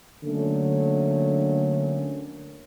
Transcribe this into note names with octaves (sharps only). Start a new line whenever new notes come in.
D3 F#3 A3 A#3 C#4